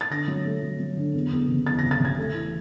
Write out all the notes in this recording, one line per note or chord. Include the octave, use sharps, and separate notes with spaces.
A6
D3 A#6
F#3
A3
F#3
F#3
D3
E2
E2
F#1
E2 A6
A#6
F#1
A6
F#1 G#6
A3
E3